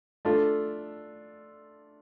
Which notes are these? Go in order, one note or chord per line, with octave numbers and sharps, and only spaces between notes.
A3 D4 F4 A4